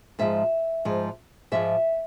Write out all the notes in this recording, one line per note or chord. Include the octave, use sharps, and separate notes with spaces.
G#2 F3 G#3 E5
G#2 F3 G#3
G#2 F3 G#3 E5